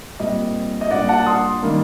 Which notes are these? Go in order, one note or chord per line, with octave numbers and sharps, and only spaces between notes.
A#2 G3 C4 D#5
D#5
A#2 G3 D4 D5 F#5
F#5 A5
C6 D#6
D#3 G3 A#3